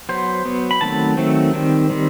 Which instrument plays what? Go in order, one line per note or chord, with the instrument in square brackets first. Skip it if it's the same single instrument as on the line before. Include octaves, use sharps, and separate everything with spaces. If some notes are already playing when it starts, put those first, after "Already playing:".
[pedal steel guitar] F#3 B3 C5
F#3 B3
B5
D#3 F#3 A3 C4 A5
D#3 F#3 A3 C4
D#3 G3 C4
D#3 G3 C4